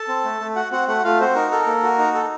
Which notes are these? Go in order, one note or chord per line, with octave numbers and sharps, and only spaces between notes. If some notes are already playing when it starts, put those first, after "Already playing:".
Already playing: A4 A5
C4
A3
A3
F#4 F#5
C4 F#4 F#5
A3 F#4 F#5
A3 F4 F5
C4 F#4 C5
D#4 A#4
A4 A#4
A#3
F#4
D#4
A4